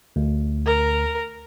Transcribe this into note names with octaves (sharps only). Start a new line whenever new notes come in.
D2
A#4